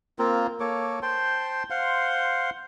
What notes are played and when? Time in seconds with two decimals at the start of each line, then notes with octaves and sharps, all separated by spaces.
0.19 A#3 C4 F4 A#4
0.60 A#3 A4 C#5 D6
1.02 C5 G5 A5 C6
1.70 C5 F5 F#5 C6